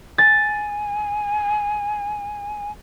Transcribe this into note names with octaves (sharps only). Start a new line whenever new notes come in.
G#5 A6